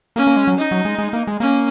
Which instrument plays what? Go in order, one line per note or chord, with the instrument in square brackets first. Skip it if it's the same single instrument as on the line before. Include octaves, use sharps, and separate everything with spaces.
[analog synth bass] A#3 [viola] C#4
[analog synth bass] A#3
G#3
F#3
[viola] D#4
[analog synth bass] F#3
G#3
G#3
A#3
G#3
[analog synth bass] A#3 [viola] C#4